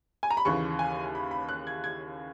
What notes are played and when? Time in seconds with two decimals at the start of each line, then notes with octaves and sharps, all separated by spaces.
0.23 G#5
0.30 A#5
0.37 B5
0.45 D#2 C#3 E3 C#6
0.79 G#5
1.15 B5
1.31 B5
1.49 F#6
1.67 G#6
1.84 G#6